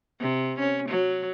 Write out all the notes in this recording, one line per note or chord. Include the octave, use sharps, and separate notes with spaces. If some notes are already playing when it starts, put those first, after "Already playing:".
C3
C#4
F#3